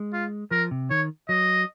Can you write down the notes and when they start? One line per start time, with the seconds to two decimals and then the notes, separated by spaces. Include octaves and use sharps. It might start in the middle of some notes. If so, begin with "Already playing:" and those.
Already playing: G#3
0.13 F4
0.51 F3 A#4
0.71 C3
0.90 D#3 C#5
1.29 F#3 D#5